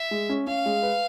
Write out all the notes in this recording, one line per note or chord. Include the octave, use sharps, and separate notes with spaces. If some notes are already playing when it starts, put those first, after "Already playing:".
Already playing: E5
G#3
C#4
C#4 F5
G#3
B4